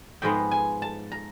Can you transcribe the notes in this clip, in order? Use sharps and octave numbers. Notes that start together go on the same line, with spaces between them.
G#2 F3 G#3 B3 G5
G#5
A5
A#5